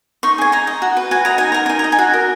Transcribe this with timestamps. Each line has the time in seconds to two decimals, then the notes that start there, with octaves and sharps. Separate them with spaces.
0.23 D#4 C#6
0.38 G#4 G#5
0.52 D#4 A#5
0.67 D#5
0.82 F#4
0.97 B4
1.11 F#4 G#5
1.25 D#5 A#5
1.38 D#4 G#5
1.52 A#4 A#5
1.66 D#4 G#5
1.79 D#5 A#5
1.92 G#5
1.99 F#4
2.14 A#4